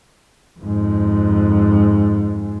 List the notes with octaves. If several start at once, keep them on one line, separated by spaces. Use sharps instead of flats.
F2 G#2